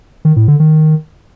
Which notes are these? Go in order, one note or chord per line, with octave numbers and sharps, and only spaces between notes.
D#3
A2
D3
D#3